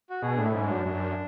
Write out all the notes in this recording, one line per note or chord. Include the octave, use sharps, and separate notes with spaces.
F#4
B2 G#4
A2 D4
E4
G#2 C#4
D4
F#2
F#2